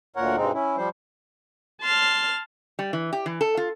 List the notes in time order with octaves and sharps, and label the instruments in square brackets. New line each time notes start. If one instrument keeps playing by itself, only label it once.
[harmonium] D2 A#2 A#4 C#5 F#5
G2 B2 G#3 C4 D#4
C#4 E4
F3 G3 C5
[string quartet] A5 C6 F6
[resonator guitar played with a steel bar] G3
E3
G4
E3
A4
F4